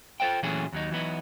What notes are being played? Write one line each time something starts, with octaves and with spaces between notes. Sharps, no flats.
F4 A4 C5 F5 G5
A#2 E3 F#3 A3 C#4 G#4
D#2 F#3 D#4
E3 F#3 B3 D#4